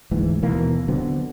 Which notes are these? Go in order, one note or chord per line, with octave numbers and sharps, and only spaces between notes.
D2 G#2 E3
D#2 B2 E3 A#3
D3 F#3 B3 C4